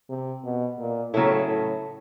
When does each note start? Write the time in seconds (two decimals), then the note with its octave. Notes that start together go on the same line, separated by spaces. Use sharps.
0.10 C3
0.44 B2
0.79 A#2
1.13 A2 C#3 F#3 B3 E4 A4
1.48 A2